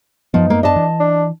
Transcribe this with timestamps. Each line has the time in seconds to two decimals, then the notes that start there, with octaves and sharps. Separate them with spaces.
0.34 F#2 F3 B3 D#4
0.50 A#3
0.63 D4 D#5 A5
0.76 E3
1.00 D4